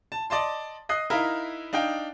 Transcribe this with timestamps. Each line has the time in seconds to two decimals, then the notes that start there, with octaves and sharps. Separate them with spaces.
0.12 A5
0.30 D5 D#5 A5 C6
0.89 D#5 D#6 F#6 C7
1.10 D#4 E4 A#4 F5
1.73 D4 D#4 F5 G5